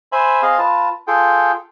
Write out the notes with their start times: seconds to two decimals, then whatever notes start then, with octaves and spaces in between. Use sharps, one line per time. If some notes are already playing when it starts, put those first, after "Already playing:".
0.12 C5 E5 G#5 B5
0.42 C4 G#4 D#5 F5
0.58 F4 B4 A5
1.07 F4 G#4 A4 G5